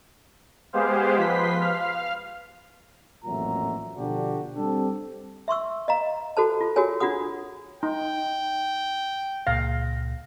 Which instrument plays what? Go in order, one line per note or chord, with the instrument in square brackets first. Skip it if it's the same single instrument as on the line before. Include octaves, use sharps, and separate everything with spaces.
[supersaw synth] G#3 B3 G4 G#4 C5 F5
F3 B4 C6 B6
F5 F6
[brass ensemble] A1 F2 A#2 F#3 E5 A#5
B2 D3 F3 D4 F#4 G4
G3 C4 D4 G4 A4
[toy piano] E5 C6 C#6 E6
D#5 F5 A#5
F#4 A4 C5 A5
F4
F#4 G#4 A#4 C#5 G#5
D4 F4 F#4 F#5 D#6
[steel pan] D#4 [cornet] G5
[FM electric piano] C#2 A#2 A#6 [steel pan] F5